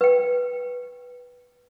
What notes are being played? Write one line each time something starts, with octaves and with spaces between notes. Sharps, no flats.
B4 G5